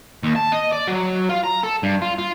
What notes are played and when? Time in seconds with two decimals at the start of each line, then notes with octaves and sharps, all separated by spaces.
0.23 D#2
0.36 A5
0.52 D#5
0.72 D5
0.87 F#3
1.29 F4
1.44 A#5
1.64 A4
1.83 G2
2.02 F4
2.18 F4